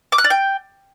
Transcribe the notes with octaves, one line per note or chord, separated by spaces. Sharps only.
D6
F#6
D5
G5